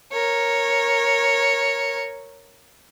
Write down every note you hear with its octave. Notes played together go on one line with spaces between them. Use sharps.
A#4 C#5